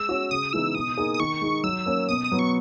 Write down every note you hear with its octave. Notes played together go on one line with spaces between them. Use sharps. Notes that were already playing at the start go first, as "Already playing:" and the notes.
Already playing: G#3 E6
C#4 F#4
C#3 D#6
E3 G#3 B3 D#4 E6
B2 D#6
A#3 D#4 G#4
D#6
D#3 C#6
G#3 D#4
F#3 E6
A#3 C#4
B2 D#6
D#6
F#3 B3
C#6